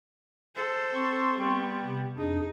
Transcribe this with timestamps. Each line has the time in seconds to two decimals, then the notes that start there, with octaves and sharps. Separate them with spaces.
0.55 A4 C5
0.94 C4 C6 C#6
1.38 G3 B3
1.84 C3
2.18 F2 D4 D#4 G#4